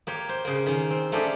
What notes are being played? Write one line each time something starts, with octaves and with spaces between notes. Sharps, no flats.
A#3 G4 C#5
C5
C#3 A#3
D#3 A#3 C#4
C4
A3 A#3 C#4 D4 G4 G#4